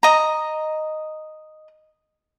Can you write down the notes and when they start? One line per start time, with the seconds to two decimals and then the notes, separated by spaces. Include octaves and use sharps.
0.03 D#5 A#5